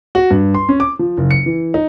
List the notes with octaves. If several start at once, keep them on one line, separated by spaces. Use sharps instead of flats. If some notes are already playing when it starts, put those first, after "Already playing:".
F#4
G2
C6
C#4
D6
F3
F#1
C#7
E3
D#4